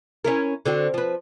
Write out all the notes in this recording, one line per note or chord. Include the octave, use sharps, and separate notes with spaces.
C#4 E4 A#4
D3 C4 F#4
F3 B4